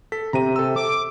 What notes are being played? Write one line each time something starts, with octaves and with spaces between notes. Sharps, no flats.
A4 B6
C3 A#5 D#7
A4 E6
D6